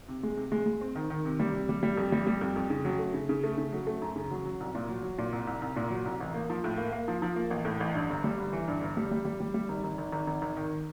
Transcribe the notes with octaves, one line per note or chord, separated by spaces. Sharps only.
C3
G#3
C3
G#3
G#3
C4
D#3
D#3
C3
G3
C3
G3
G3
F2
G3
G3
F2
F2
C#3
F#3
A3
C#3
C#3
A3
C#3
F#3
A3
F#2
C#3
F#3
F#3
C2
A#2
F#3
F#3
A#2
C2
C2
C2
A#2
F#3
C2
A1
A#3
F3
A2
A#3
A#3
F3
F3
A#3
A1
A2
A1
G2
G1
G3
G1
E3
G2
G1
G3
G3
G3
G3
G3
G#1
G#1
G#1
G#1
G#1
G#1
D#3